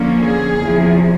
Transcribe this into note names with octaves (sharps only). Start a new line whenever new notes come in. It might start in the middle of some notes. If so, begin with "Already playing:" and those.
Already playing: D3 F3 A#3 C#4
G#4
E2 C3 F3